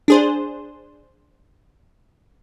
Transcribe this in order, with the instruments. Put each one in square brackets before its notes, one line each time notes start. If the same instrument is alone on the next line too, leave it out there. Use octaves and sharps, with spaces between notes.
[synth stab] D4 G#4 C5